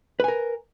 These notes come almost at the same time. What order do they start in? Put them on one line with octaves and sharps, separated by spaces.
B4 G#5 A#4